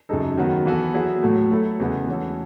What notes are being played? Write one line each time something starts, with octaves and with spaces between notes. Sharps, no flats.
F#2 C#3 G#3 D#4 A4
D#3 F#3 B3 F#4
E3 B3 F#4 A4
F#3 B3 E4 G#4
A2 F#3 A3
F#3 A3 E4 A4
E2 C#3 G#3 B3
E3 A3 C#4 F#4 A4